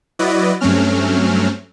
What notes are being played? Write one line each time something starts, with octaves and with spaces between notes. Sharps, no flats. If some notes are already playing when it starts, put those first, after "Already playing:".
F#3 E4 F#4 B4 D5 D#5
G2 F#3 A3 C4 C#4 F6